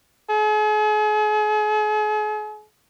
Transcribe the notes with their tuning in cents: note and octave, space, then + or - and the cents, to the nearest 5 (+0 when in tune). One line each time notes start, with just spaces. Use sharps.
G#4 +40